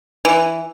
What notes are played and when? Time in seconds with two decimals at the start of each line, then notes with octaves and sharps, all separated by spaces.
0.25 E3